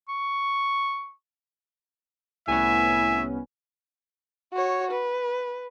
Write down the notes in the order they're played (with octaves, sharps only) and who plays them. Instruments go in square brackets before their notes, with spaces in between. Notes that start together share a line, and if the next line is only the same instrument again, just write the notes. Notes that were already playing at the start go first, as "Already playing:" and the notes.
[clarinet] C#6
[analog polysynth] C2 B3 C#4 [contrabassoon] A2 [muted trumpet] E5 [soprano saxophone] G#5
[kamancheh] F#4 C#5
B4